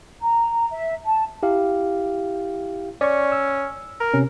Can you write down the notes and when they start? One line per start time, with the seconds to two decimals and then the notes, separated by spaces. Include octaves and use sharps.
0.21 A#5
0.71 E5
1.05 A5
1.43 E4 G4 F5
3.01 C#4 D5 C#6
3.32 E6
4.00 A#4
4.14 C3 C#4